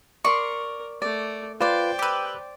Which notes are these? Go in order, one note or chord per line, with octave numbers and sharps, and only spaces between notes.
A#4 D5 C6 C#6
A3 D5
F4 B4 C5 D5 G5
G4 B4 D6 E6